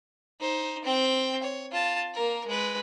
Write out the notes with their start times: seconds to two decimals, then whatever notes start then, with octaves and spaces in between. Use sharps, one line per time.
0.40 D#4 C5
0.84 C4 G5
1.43 C#5
1.71 F4 A5
2.14 A#3 A#4
2.47 G#3 B4